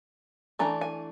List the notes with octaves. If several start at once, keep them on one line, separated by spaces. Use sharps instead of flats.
E3 A3 D4 A#5
G#5